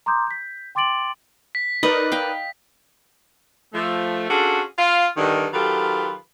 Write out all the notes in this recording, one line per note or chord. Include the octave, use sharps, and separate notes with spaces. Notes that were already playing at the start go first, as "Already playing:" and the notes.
A#5 C6 D6 D#6 G6
G6 B6
G5 C6 D6 A6 D7 F#7
B6
D#4 A#4 B4 D5 D#5
F5 G5
F3 A3
C#4 D4 F4 F#4 G#4 A4
F4 F5
G2 D3 D#3
D#3 F#3 F4 G4 A4 B4